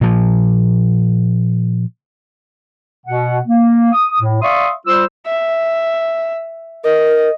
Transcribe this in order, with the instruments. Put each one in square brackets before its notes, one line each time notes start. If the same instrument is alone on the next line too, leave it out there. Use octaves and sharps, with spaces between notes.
[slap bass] A#2 F3
[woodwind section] B2 F#5
A#3
D#6
A2
D5 E5 F5 C6 C#6 D#6
G3 F4 C5 E6
[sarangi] E5
[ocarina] A#4 [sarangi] D#5